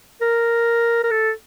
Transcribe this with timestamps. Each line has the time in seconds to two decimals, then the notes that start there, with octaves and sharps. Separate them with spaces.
0.21 A#4
1.04 A#4
1.11 A4